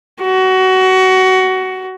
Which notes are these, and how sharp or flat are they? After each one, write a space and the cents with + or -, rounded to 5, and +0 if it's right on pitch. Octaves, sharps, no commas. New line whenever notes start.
F#4 +20